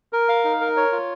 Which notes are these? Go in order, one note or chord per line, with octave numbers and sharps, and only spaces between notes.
A#4
F5
D#4
A#4
C#5
F4